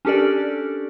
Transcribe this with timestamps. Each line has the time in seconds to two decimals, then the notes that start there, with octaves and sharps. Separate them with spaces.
0.05 C#4 D4 G4 A4 A#4 D5